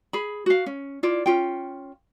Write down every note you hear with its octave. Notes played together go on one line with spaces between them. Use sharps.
G#4 B5
F#4 F5
C#4
E4 F4 D5
C#4 F4 G5